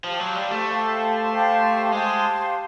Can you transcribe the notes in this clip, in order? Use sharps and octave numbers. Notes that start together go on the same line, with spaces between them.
F3 G4 C5 F5 A5
F#3
G3
A3
G4 C5 F5 A5
G4 C5 F5 A5
G#3 G4 C5 F5 A5